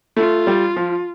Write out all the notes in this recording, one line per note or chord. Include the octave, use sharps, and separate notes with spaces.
A3 F4
G3
F3